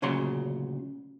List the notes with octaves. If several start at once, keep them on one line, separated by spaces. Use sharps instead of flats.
D2 A#2 C#3 F#3 C6